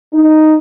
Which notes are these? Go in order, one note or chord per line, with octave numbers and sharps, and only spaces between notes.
D#4